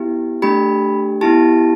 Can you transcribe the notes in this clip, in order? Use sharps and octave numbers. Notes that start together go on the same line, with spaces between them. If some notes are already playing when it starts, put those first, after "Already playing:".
Already playing: B3 E4 G4
A3 D4 G4 B5
B3 E4 G4 A5